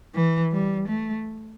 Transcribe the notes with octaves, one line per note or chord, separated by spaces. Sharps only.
E3
G3
A3